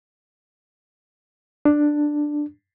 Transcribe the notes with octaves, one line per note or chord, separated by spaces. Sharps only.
D4